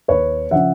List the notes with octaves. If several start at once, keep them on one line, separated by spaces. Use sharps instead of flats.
D#2 B4 C#5
C#3 F3 E5 F#5